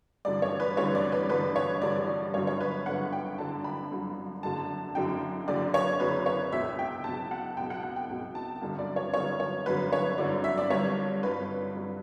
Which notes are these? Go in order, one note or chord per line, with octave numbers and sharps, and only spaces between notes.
A1 G2 D3 F#3 D5
C#5
B4
A1 G2 D3 F#3 C#5
D5
B4
A1 G2 D3 F#3 B4
C#5
A1 G2 D3 F#3 D5
D5
G1 F#2 D3 F#3 C#5
C#5
B4
G1 F#2 D3 F#3 F#5
G5
G1 F#2 D3 F#3 A5
B5
G1 F#2 D3 F#3
F#1 F#2 D3 F#3 A5
F#1 F#2 D3 F#3 G5
F#1 F#2 D3 F#3 D5
C#5
F#1 F#2 D3 F#3 B4
C#5
C#2 B2 F#3 E5
G5
C#2 B2 F#3 A5
F#5
C#2 B2 F#3 G5
F#5
F#5
G5
C#2 B2 F#3
A5
G1 F#2 D3 F#3
D5
C#5
G1 F#2 D3 F#3 C#5
C#5
G1 F#2 D3 F#3 B4
C#5
G1 F#2 D3 F#3 D5
E5
D5
G1 G2 F#3 C#5
G1 G2 F#3 B4
G2 F#3